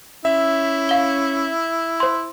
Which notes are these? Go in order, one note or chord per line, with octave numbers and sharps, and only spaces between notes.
C#4 E4 E5
F5 G7
C5 C6